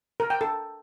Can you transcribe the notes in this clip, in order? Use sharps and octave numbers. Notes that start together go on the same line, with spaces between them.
A#4
G5
A4